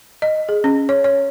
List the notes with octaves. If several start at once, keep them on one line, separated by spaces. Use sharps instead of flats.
D#5
G#4
C#4
C#5
C#5